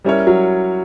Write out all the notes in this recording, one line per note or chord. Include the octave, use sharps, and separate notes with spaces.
G3 C#4 E4 A#4 C#5
F#3